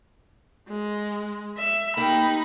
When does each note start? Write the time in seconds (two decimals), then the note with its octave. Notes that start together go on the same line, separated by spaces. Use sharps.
0.69 G#3
1.58 E5
1.97 A#3 D#4 G4 A#4 B5